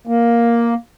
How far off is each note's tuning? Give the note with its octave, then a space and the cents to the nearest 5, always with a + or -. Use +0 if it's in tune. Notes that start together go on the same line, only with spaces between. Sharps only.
A#3 +5